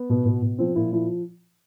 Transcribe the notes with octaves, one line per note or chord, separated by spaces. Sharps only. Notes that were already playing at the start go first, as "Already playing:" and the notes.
Already playing: B3
B2
B2
B2
F3 C4
A#2 E4
F3 E4